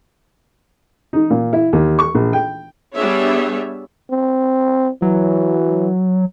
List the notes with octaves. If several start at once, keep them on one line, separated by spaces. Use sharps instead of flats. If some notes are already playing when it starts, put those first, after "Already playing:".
D#4
A#2
E4
D#2
C#6
A#1
G5
G3 B3 D4 G#4 C#5 E5
C4
E3 F#3